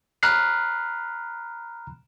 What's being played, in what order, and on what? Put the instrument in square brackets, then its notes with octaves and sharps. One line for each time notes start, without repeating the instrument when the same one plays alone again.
[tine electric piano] A#5 B5 F6 F#6 C7